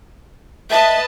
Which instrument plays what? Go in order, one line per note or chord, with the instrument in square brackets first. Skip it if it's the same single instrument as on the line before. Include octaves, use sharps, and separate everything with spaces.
[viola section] B4 D#5 A5 [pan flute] E5